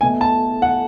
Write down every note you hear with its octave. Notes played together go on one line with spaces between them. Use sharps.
B2 A3 G#5
A5
F#5